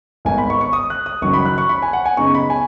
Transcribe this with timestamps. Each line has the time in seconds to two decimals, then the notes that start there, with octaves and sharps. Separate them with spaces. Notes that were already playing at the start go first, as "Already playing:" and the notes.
0.25 G#1 G#2 D#3 B3 D#4 G#5
0.38 B5
0.50 C#6
0.61 C#6
0.73 D#6
0.90 F#6
1.06 D#6
1.21 F#1 F#2 D#3 F#3 C#6
1.34 B5
1.45 F#6
1.58 C#6
1.69 B5
1.82 G#5
1.93 F#5
2.06 G#5
2.17 F#2 C#3 B3 D#4 C#6
2.35 B5
2.50 G#5